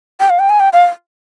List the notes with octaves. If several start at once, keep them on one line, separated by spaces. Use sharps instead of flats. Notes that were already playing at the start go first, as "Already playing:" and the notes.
G5
F5
G5
G#5
G5
F5